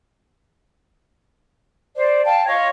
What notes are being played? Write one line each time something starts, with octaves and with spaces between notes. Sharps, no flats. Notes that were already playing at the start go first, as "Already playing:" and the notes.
C5 D5
F5 G5 A5
F4 C#5 D#5 F5